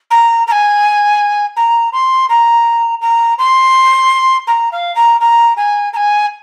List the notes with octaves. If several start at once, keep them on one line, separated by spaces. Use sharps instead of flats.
A#5
A#5
G#5
A#5
C6
A#5
A#5
C6
A#5
F5
A#5
A#5
G#5
A#5
G#5